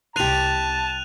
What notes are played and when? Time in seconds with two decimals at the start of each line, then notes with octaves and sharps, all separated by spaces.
0.16 C2 G4 A5 C6 F#6 D#7 F7